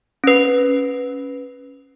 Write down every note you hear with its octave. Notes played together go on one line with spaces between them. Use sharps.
C#4 B4